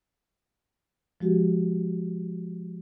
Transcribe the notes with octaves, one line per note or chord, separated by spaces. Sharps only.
F3 G#3 F#4 G4